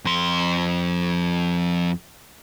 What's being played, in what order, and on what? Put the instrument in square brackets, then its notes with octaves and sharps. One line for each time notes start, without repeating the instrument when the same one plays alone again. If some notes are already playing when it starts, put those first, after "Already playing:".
[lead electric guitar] F2 C6